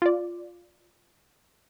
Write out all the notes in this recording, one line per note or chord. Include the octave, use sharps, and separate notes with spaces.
F4 D5